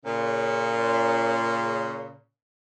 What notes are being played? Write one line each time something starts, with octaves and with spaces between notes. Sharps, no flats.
A#2 C#3